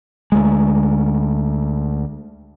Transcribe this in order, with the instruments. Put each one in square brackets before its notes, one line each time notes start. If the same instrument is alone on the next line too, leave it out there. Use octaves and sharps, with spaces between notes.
[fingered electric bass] D2 G#3